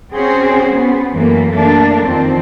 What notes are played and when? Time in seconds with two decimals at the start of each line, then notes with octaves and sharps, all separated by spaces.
0.14 C4 C#4 F#4 G#4 C5
0.74 B3
1.12 F#2 E3 A3 A#3
1.51 A3 A#3 D4
2.04 F2 D#3 F3 C4